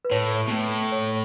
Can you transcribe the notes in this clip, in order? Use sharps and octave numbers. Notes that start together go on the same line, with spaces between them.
B4
A2 C#5
B2
A2
C#5